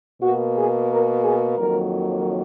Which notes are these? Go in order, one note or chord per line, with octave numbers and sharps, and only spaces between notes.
B2 A#3 F#4
G#4
A#4
G#4
F2 D#3 F#3 A#3 A#4